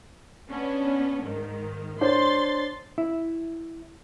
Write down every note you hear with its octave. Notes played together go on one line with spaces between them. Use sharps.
B3 C#4 D4
G#2 D#3
D4 C5 C#5 C6 A6
E4